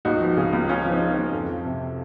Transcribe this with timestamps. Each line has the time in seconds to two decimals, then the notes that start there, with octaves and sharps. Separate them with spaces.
0.05 C#2 D#4 F#4
0.20 F3
0.37 C#3
0.53 C#2
0.69 C#2 C#4 F4
0.85 F3
0.90 C4 D#4
1.01 C#3
1.12 C4
1.18 C#2
1.33 F2
1.49 F3
1.65 C3